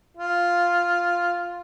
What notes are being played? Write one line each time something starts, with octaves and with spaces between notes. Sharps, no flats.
F4